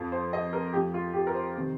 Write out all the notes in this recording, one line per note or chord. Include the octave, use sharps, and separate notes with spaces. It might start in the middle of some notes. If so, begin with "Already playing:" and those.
Already playing: F2 F3
C5
D#5
A#4
F2 F3 G4
F4
G4
A#4
C5
C3 D#3